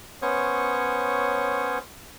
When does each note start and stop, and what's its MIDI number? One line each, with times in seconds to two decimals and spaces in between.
0.22 1.78 59
0.22 1.78 61
0.22 1.78 72
0.22 1.78 73
0.22 1.78 85
0.22 1.78 87